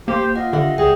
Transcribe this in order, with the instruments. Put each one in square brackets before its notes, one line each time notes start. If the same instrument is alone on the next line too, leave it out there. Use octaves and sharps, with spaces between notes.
[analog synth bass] A#3 [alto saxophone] G4 [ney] C5
[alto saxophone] F4 [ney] D#5 [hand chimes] F#5
[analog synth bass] D3 [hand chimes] G4 E5 F#5
[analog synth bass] C#2 [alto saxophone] G#4 [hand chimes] D5 G5